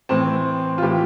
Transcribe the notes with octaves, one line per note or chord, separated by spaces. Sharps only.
A2 E3 C4
F4
A2 E3 G4